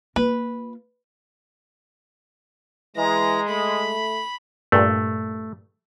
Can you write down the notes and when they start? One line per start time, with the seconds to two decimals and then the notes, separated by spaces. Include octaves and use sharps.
0.16 A#3 F4 B4
2.97 E3 G#3 A#5
3.49 A3 B5
4.72 G2 A#2 A3